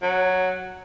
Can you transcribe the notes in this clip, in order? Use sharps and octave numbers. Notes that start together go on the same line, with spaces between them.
F#3